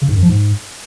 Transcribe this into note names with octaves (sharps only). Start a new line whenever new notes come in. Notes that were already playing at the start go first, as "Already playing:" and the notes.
C#3
G#2
F#2
F3
G#2